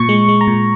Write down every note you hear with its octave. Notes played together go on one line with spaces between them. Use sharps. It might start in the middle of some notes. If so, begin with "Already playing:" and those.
Already playing: A#2 C#6
G#3
G#3
A#5
A#2